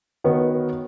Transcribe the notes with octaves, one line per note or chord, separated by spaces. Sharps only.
D#3 B3 F#4 C#5